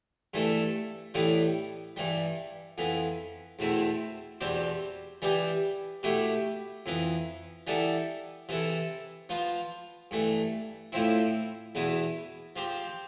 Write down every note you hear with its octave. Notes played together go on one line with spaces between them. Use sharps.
G2 E3 A3 E4 A4
A2 E3 G3 B3
G2 E3 G3
F2 E3 B3
E2 B2 A3 C4 E4
E2 B2 G3 C4 G4
E3 G3 B3 E4 G4
B2 A3 E4 G4
F2 E3 B3
E3 G3 B3 E4 A4
C3 E3 B3 E4 A4
F3 B3 F4
G2 E3 A3
A2 F3 C4 E4
E2 B2 B3 E4
F3 C4 G4